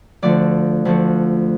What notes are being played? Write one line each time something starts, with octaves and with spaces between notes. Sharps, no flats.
D2 D3 F3 A3 D5
D2 D3 F3 A3